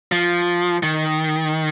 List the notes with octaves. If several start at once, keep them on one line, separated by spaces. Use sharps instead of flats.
F3
D#3